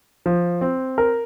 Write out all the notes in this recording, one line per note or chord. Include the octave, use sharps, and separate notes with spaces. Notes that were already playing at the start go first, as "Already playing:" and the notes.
F3
C4
A#4